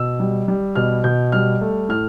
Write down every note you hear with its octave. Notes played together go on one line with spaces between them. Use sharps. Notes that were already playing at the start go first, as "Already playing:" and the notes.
Already playing: B2 E6
G3
G3
B2 F6
B2 G6
G3 F6
A3
A2 F6